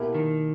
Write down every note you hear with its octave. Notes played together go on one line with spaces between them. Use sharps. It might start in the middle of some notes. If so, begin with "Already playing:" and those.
Already playing: B2 A#3 E4 G4 A#4
D#3